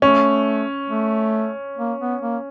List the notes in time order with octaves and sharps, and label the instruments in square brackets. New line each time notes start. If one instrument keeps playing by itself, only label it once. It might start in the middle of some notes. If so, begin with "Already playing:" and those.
[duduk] A3 [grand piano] C#4
[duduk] A3
A#3
B3
A#3